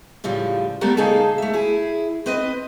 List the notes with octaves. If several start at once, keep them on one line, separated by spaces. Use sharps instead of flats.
A2 C#3 F3 G3
G3 A3 B3 A#4
C#3 A#3 D#4 G#4 A4
A3 E5
E4 G#4
C4 B4 D#5